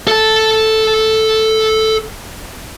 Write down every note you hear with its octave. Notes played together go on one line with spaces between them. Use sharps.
A4 A5